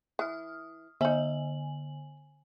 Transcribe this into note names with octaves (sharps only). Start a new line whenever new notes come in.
E3 D#6 F6
D3 D#4 E5 G#5 F#7